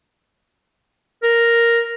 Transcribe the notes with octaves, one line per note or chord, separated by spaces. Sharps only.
A#4